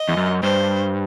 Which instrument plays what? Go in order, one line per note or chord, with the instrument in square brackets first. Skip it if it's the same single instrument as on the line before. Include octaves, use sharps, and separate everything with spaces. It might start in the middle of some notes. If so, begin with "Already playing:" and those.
Already playing: [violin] D#5
[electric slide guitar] E2
F#2
[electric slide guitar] G2 [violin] C5